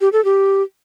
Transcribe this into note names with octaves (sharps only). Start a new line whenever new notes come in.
G4
A4
G4